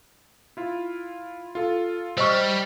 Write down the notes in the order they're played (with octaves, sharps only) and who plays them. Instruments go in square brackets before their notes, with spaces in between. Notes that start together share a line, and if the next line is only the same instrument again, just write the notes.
[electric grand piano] E4 F4
F4 A4
[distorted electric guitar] G3 [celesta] C5 D#5 C#6 [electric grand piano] E6 F6